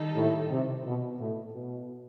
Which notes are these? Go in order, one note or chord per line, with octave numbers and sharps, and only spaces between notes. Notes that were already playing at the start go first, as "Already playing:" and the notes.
Already playing: D#3 G3 D#4 A4
A2
C3
B2
A2
B2